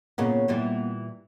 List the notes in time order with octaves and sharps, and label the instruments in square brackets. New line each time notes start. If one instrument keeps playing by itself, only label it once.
[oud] A#2 C#3 [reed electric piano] A#3 B3 F#5
[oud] A#2 E3 G3